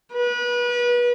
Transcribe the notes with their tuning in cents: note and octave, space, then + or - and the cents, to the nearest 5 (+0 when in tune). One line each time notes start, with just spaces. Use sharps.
B4 -30